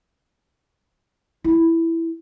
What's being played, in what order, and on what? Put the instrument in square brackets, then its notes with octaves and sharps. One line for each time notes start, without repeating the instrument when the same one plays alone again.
[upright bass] E4